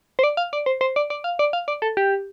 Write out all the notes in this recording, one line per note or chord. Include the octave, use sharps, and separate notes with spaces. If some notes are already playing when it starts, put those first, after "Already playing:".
C5
D5
F5
D5
C5
C5
D5
D5
F5
D5
F5
D5
A4
G4